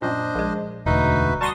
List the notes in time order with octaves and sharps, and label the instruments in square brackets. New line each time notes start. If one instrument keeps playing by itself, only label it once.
[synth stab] F#2 A#2 [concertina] D4 C5 D#5
[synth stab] A#1 G#3
[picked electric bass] E1 D2 [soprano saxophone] D#4 [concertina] F#4 B4 E5
[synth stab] G3 C6 D#6 [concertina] F#4 A#5 C#6 [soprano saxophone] A5